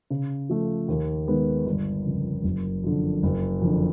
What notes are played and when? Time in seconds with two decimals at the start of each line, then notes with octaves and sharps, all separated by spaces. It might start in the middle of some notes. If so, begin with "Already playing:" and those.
0.10 C#3
0.49 F3 A3
0.88 D#2
1.28 D#3 G#3 B3
1.66 G1
2.05 F2 C#3
2.44 F#1
2.84 F2 D3
3.23 F#1
3.62 F2 D3